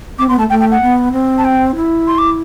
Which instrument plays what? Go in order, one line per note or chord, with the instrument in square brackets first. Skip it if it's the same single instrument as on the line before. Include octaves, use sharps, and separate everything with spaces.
[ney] C4 [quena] D6
[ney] B3 [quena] C6
[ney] A3 [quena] A5
[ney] A3 [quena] G5
[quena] G5
F#5
[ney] B3
C4
[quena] A5
G5
[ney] E4
[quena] C6
D6